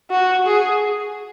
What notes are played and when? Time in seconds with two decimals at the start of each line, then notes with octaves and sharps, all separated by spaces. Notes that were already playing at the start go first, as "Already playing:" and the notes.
0.11 F#4
0.46 G#4